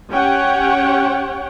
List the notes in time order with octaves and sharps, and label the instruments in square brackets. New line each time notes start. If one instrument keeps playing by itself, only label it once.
[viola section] C#4 G4 C#5 F#5 G5